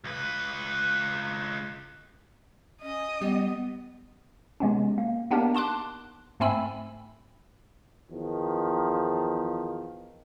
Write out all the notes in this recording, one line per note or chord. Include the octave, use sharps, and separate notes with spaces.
C#2 B4
C#4 D#5
G3 B3
C3 G#3 B3 C#4
A#3
A#3 B3 D4 D#4 G4 A#4
A5 C6 D6 F#6
G#2 A3 C4 G#5 B5 E6
E2 D#3 F3